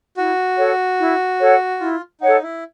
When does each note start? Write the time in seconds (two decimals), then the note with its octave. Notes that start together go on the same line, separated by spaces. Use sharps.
0.17 E4 F#4
0.58 A4 C#5 F#5
0.99 E4
1.40 A4 C#5 F#5
1.80 E4 F4
2.21 D#4 A4 C#5 F#5
2.42 E4